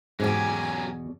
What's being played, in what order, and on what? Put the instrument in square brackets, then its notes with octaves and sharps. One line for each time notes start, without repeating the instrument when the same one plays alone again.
[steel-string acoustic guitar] E2 B2 [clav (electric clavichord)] G#2 [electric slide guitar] F#3 C#4 G4 [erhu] G#5